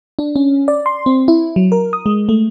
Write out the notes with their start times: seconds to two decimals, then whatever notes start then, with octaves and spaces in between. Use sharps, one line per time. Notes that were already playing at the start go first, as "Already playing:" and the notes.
0.19 D4
0.36 C#4
0.68 D5
0.86 C6
1.06 C4
1.28 E4
1.56 F#3
1.72 A#4
1.93 D#6
2.06 G#3
2.29 A3